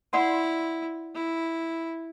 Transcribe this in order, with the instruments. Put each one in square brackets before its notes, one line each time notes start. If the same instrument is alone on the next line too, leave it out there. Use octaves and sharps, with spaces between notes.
[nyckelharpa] E4 [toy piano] D5 F#5 C6
[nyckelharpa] E4